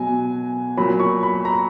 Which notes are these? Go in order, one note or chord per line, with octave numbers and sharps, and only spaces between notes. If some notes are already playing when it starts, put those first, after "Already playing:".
Already playing: B2 F#3 G#5
A#2 F#3 B5
C#6
B5
A#5